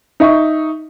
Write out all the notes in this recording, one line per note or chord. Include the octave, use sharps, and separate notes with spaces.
D#4 E5 C#6